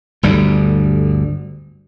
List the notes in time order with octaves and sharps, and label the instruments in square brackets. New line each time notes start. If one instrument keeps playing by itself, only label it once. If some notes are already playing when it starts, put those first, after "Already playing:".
[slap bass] G1 D2 G3